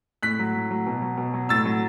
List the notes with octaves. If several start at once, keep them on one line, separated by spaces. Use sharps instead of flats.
A2 F#6 B6
F#3
A2
F#3
B2
F#3
B2
F#3
A2 E6 A6
F#3